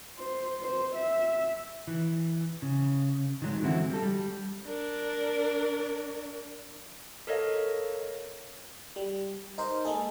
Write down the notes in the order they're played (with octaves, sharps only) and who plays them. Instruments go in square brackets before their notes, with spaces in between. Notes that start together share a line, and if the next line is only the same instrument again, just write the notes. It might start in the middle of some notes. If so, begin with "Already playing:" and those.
[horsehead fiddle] C5
C5
E5
[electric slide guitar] E3
C#3
D#3 F#3 G#3
D3 E3 C4 E4 F#4
G3 A4
G3
[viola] D4 A#4
[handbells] A4 A#4 C#5 D#5 F5
[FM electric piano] G3
D#4 A#4 C5
G#3 A#3 G#4 A4